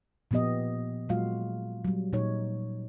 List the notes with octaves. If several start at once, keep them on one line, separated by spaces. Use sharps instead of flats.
A#2 F3 B3 G4 D#5
A#2 F#3 G#3 F4 F#4 F5
F#3 G3
A#2 D#4 C#5